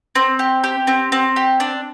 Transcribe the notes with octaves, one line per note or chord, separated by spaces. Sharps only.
C4
G4
G4
C4
C4
G4
D4